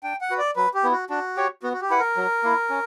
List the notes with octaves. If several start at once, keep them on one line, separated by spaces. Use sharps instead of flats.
D4 G5
F#5
F#4 B4
D5
F#3 B4
G4
B3 E4
F#4
D4 F#4
G4 C#5
B3 F#4
F#4
G4
E4 B4 F#5
A#4
F#3
A#3 E4
C#4